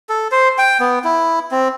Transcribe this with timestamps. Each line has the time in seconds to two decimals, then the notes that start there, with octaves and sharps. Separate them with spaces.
0.09 A4
0.32 C5
0.58 G5
0.80 B3
1.04 E4
1.51 C4